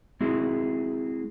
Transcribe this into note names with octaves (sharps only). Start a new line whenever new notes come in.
G#3 C4 E4 F#4 G#4